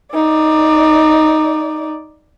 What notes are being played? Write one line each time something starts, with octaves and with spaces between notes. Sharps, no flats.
D#4 D5